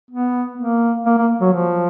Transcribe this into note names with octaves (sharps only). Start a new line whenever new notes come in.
B3
A#3
A#3
A#3
F#3
F3